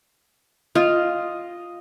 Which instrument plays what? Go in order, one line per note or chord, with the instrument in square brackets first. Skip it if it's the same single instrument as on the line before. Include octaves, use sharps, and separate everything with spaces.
[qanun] F4 [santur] D#5